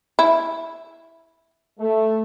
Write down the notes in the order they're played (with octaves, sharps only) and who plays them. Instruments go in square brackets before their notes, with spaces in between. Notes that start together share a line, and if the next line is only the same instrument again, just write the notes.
[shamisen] E4
[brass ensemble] A3